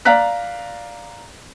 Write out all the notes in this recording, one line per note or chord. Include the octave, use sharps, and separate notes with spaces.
D5 F5 A#5 F#6 B6